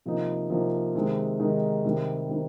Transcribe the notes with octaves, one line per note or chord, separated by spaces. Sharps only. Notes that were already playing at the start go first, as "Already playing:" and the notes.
C3 F3 A#3 D#4
C3 F3 A#3 D#4
C3 D#3 G#3 D#4
C3 D#3 G#3 D#4
C3 D#3 G3
C3 D#3 G3